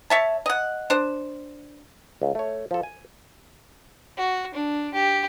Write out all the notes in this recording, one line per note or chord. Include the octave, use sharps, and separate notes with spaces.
C#5 E5 A5
D#5 F#5
D4 C5
C#2
A3 C#5
F3 A4
G#5
F#4
D4
G4